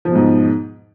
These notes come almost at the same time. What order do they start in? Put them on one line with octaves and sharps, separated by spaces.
F3 E2 B2 G#2